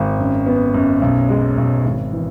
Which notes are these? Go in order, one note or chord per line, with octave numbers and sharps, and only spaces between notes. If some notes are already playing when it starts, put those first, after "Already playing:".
Already playing: G#1
F#2
B3
F#2
B1
G#3
B1
G#1
E3